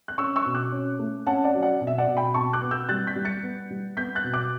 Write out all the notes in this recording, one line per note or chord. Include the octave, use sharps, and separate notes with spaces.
F#6
C#4 C#6 E6
C#6 E6
B2
D6 F#6
C#4
A3
C#4 F#5 A5
D5 F#5
F#3
D5 F#5
B2
E5
D5 F#5
B2
G5 B5
B2 A5 C#6
D6 F#6
B3
E6 G6
G3 F#6 A6
G6 B6
G3
A6 C#7
B3
G3
B3 G6 B6
F#6 A6
B2
D6 F#6